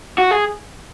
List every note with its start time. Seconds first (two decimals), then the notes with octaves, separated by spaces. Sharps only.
0.18 F#4
0.31 G#4